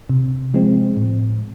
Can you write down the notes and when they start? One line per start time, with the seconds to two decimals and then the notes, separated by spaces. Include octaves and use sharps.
0.09 C3
0.54 F3 G#3 C4
0.97 A2